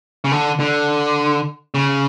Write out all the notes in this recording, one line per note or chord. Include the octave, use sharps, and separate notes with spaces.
C#3
D3
D3
C#3